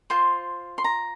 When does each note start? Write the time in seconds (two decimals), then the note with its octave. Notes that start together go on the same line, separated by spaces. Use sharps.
0.10 F4 C5 C6
0.78 C6
0.84 A#5